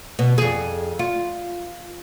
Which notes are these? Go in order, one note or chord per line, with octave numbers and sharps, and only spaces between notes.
B2
F2 G#4
F4